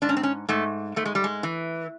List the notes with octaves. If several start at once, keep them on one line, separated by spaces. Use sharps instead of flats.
G#2 D4
C#4
C4
C#4
G#2 A3
G#2 A3
G#3
G3
G#3
E3